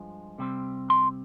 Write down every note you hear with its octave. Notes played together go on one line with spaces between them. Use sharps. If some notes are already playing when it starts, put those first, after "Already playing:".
Already playing: G2 F3 G#3
C3 G3 C4
C6